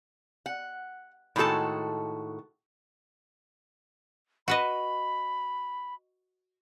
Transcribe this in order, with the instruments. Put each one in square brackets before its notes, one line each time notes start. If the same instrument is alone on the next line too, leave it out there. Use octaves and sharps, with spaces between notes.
[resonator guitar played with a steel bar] F#5
A2 D#3 G#3 F#4 A4 A5
[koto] F#4 B4 D#5 [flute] B5